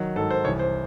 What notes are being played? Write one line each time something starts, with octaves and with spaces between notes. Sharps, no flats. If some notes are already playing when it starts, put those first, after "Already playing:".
Already playing: D#3 F#3
G#2 D#3 F#3 A4
C5
C2 C3 E3 C#5
C5